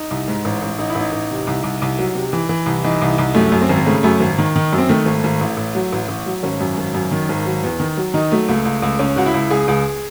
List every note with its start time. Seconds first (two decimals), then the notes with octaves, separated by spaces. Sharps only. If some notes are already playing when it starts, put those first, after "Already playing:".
Already playing: D#4
0.11 C2
0.28 G#2
0.45 A1
0.62 A1
0.79 A1 D#4
0.90 E4
0.95 A1
1.01 D#4
1.12 A1
1.30 C3
1.47 C2
1.64 C2
1.82 C2
1.99 F#3
2.15 C3
2.33 E3
2.49 E3
2.66 C2
2.84 E3 D#4
3.02 C2
3.18 C2
3.35 F#2 A3
3.52 F#2
3.61 C4
3.69 G#1
3.86 C#3 A3
4.03 F#2 A3
4.20 G#1
4.38 D#3
4.56 D#3
4.73 F#2
4.78 C4
4.89 D#3 A3
5.06 G#1
5.24 G#1
5.41 A1
5.57 A1
5.75 F#3
5.92 A1
6.08 A1
6.26 F#3
6.43 G#1 C#4
6.60 F#2
6.78 G#1
6.94 F#2
7.11 D#3
7.29 G#1
7.46 F#3
7.64 E2
7.80 D#3
7.97 F#3
8.14 D#3 D#4
8.32 F#3 A3
8.49 C#2 A3
8.65 C#2
8.82 C#2
8.99 C#2 C#4
9.16 C#2 F#4
9.26 E4
9.34 C#2
9.51 C#2 G#4
9.68 C#2